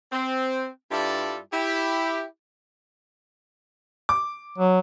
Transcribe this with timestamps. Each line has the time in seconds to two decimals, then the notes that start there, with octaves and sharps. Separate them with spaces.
0.12 C4
0.91 G2 G3 E4 F4 A4 D5
1.53 E4 G4
4.09 D6
4.58 F#3